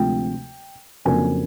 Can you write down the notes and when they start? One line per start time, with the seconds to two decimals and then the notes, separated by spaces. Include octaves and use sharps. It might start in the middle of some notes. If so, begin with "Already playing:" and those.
Already playing: D2 C3 F3 G#3 G5
1.05 F2 C#3 F#3 A#3 D4 G#5